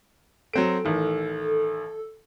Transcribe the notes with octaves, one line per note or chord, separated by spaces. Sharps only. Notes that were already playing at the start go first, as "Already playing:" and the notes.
F#3 C4 A4 D7
A1 D#3